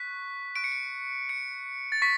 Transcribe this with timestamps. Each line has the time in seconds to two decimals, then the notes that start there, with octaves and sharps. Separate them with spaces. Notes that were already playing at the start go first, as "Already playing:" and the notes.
Already playing: C#6 F#6 B6
0.55 C#6 F#6 D7
0.64 C#7
0.72 D7
1.29 C#7
1.92 A6
2.02 C#6 B6